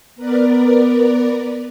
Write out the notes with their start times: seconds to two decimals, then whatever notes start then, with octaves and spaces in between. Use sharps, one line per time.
0.16 B3 A#4 B4 D5